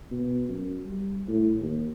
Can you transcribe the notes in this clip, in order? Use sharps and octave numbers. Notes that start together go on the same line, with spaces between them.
B2
F#2
G3
A2
D#2